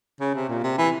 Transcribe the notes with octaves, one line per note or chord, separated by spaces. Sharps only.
C#3
C3
A#2
C3
E3